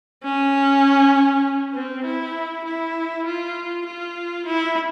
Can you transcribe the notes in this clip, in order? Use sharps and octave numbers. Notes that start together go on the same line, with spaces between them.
C#4
C4
E4
E4
F4
F4
E4